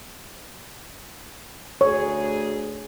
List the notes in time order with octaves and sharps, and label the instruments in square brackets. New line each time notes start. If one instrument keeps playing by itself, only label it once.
[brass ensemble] D2 G#4 [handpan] C#5